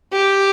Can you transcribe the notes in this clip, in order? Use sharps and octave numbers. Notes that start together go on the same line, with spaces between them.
G4